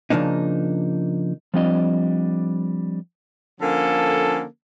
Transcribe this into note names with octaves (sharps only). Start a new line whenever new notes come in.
C#3 F3 A#3 D4 D#4
F3 G3 C4 D4 F4 D#5
D3 F3 A#3 C#4 A4